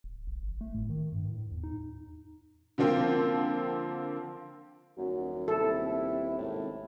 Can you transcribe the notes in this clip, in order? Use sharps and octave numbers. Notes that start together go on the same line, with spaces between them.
D1
A#1
G1
A3
A2
D#3
G2
A2
E2
D#4
D3 F3 A#3 C4 F4
D#1 F#2 F#4
C3 E4 A4
G#1 A2